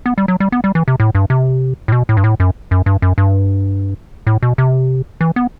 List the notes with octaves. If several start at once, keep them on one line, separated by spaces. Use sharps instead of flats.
B3
G3
F#3
G3
B3
G3
E3
C3
A2
G2
C3
A2
B2
A2
G2
A2
F#2
F#2
G2
F#2
G2
A2
B2
C3
E3
B3